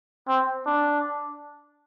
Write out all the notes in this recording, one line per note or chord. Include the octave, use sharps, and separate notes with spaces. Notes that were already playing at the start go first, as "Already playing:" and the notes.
C4
D4